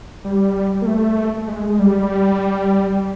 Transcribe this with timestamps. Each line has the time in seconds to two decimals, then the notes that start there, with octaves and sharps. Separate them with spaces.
0.24 G3
0.82 A#3
0.86 A3
1.48 G#3
1.69 G#3
1.79 G3